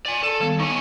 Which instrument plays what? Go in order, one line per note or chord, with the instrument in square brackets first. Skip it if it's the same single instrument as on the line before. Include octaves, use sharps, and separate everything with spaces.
[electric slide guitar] D5 G#5
A4
[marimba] D#3 G3 B3
[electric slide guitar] D#4 C#5 G#5 [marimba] C#6